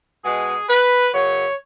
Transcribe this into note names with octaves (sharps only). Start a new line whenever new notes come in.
B2 G#3 B3 G#4
B4
F#2 C#3 B3 C#5